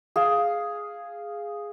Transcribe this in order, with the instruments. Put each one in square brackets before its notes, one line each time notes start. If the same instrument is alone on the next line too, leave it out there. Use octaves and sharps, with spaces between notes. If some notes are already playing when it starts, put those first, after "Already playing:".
[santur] G#4 F5